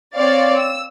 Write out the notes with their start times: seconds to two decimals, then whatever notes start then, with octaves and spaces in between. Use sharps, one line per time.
0.15 C4 C#5 D5 F5 A6
0.56 E6